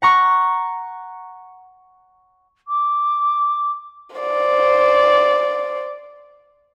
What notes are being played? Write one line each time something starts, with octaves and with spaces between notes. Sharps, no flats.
F#5 A#5 C#6
D6
C5 D5